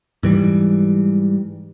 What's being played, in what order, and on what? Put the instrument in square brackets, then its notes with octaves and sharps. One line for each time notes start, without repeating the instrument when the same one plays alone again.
[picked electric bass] G#2 E3 G3